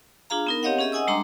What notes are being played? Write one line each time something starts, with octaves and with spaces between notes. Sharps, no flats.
D4 F4 G#4 F5 A#5
B3 D#4 A#4
C4 G4 C#5 D#5 F5 F#5
C#4 G4 G#4 D#5 E5
D#5 F#5 G#5 D#6 E6
G3 G#3 D4 A#5 C6 D6